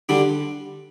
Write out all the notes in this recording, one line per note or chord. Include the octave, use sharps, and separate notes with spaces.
D3 G3 D4